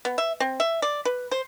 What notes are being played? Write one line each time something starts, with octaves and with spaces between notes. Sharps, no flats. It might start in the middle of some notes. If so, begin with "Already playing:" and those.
B3
E5
C4
E5
D5
B4
C5